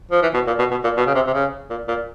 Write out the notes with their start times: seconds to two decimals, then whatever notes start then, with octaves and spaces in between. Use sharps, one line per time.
0.11 F3
0.22 E3
0.34 B2
0.47 A#2
0.59 B2
0.71 B2
0.84 A#2
0.97 B2
1.07 C#3
1.14 C3
1.27 C3
1.33 C#3
1.70 A#2
1.88 A#2